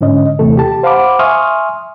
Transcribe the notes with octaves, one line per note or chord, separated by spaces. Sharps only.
G#2 D3 C#4 D#5
D#2 C3 E3 A3 A4
G4 A5
C5 F5 F#5 B5 D6
E5 G#5 C6 C#6 D#6 F6